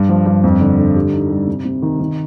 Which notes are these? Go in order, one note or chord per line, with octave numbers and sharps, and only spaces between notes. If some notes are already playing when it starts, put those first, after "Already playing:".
Already playing: G2
F3
G2
F2
D3
D3
G3
D#4
G3
C3
C3
D#3
D#3